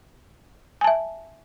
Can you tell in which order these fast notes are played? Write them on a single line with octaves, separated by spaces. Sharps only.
G#5 A5 E5